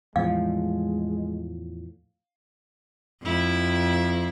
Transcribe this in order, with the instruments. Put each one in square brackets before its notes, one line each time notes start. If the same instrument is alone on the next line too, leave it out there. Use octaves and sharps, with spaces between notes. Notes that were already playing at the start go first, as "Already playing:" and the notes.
[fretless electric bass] E2 A2 F3 [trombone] G#3 [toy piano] F5
[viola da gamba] F2 E4